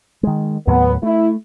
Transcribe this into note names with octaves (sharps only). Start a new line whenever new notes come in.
D#3 G#3
D#2 A2 F#3 B3
A3 E4